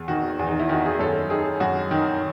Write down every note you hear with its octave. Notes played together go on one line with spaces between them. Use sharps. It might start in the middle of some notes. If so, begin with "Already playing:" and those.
Already playing: E2
D#3 F#4
E2
D#4
E4
D#3 F#4
G#4
F#2 A4
D#3 G#4
F#2 F#4
D#3